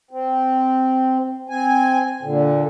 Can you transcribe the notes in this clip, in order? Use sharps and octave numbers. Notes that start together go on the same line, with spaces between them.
C4
C4 G#5
A#2 D3